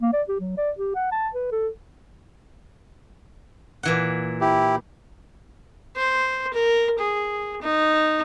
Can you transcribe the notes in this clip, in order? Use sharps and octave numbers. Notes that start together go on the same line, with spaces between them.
A#3
D5
G4
F#3
D5
G4
F#5
A5
B4
A4
A#2 E3 F#5
E4 G4
C5
A#4
G#4
D#4